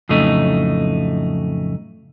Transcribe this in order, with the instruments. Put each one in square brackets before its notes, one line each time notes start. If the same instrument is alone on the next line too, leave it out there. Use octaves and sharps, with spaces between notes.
[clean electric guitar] F2 A2 C#3 F#3 A3 D#4